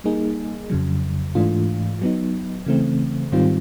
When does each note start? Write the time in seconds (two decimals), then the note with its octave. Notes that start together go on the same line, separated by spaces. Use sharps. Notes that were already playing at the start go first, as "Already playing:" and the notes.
0.04 G3 A#3 D#4 G#4
0.70 F2 C#3 F#3
1.35 G#2 E3 A3 D4 F4
2.02 F#3 B3 D#4
2.66 C#3 E3 A3 C4
3.32 G#2 D#3 G3 C4 F4